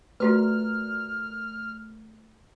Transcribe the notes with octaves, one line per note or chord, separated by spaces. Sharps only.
A3 F4 F#4 A#4 B4 D5 F6